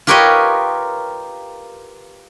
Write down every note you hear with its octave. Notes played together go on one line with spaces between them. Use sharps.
F4 G4 A#4 B4 C#5 D#5